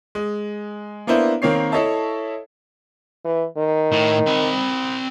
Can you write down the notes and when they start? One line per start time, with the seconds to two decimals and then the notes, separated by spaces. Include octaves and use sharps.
0.15 G#3
1.07 A#3 B3 D4 E4 C5
1.42 D#3 A#3 C4 C#5 C7
1.72 E4 A4 C#5 D#5 E5 A5
3.25 E3
3.57 D#3
3.92 A2
4.27 C4 B5